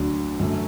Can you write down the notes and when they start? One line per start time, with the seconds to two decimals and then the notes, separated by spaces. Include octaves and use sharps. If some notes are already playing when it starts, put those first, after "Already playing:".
Already playing: D2 D3 F#3 D4
0.40 F#2 D3 F#3 A3